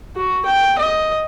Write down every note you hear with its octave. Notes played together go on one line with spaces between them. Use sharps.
F#4
G5
D#5